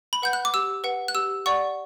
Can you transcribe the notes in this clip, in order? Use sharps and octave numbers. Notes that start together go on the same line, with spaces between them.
B5
B4 F#5 G6
F#6
D6
G4 E6
B4 F#5
F#6
G4 E6
D5 F#5 C#6